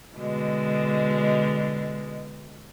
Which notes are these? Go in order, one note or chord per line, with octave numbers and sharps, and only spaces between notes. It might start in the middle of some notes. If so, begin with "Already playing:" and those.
B2 D3 G#3